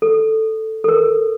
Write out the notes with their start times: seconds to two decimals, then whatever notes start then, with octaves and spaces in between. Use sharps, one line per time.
0.02 A4
0.84 A4
0.88 A#4